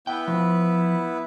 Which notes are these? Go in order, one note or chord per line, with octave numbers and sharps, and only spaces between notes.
B3 E4 B4 G5
F3